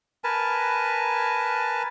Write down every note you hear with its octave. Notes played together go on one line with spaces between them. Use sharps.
A#4 B4 G#5 A5